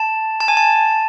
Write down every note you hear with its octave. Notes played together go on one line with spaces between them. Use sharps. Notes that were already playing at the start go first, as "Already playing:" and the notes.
Already playing: A5
A5
G#5
A5